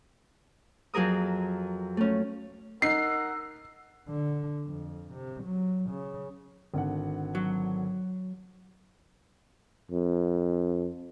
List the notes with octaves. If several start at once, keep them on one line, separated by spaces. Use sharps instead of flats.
F2 F#3 G#4 A#4 D#6
A3 C#4
D#4 A#4 F#5 E6 C7
D3
F2
C3
F#3
C#3
G#1 D3 F#5
F#3
F2